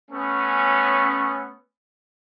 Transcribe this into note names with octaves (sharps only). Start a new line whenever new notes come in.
A3 B3 C#4